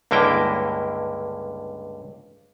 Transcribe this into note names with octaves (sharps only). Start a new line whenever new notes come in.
C#2 G2 D3 A#3 E4 G5